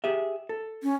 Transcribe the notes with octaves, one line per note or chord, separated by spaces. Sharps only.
G4 G#4 E5
A4
C#4